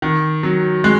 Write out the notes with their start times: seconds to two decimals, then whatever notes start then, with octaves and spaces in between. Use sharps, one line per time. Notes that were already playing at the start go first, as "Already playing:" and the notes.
0.02 D#3
0.43 F#3
0.84 G#3